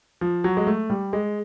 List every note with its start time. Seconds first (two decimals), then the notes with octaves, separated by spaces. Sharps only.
0.21 F3
0.44 F#3
0.57 G#3
0.67 A3
0.90 G3
1.13 G#3